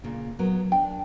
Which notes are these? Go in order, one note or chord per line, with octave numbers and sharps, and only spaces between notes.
A#2 C#3
F#3 B3 A#4
D4 G5